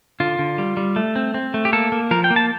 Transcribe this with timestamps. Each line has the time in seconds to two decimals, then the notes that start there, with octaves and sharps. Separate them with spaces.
0.20 D3 F4
0.39 D3
0.58 G3
0.77 G3
0.96 A3
1.16 C4
1.34 C4
1.54 A3
1.65 G4
1.73 A#3 A4
1.92 A#3
2.11 F3 A#4
2.24 G5
2.30 A#3
2.36 A5